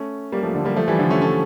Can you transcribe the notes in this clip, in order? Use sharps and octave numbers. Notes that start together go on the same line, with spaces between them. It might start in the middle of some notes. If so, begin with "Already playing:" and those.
Already playing: A3 C#4
G3 A#3
F3 A3
D3
G3 A#3
F3 A3
E3 G3
D3 F3
A3 C#4
A3 C#4